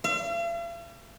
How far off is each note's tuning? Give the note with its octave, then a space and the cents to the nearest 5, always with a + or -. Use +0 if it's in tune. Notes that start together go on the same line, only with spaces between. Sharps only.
F5 -45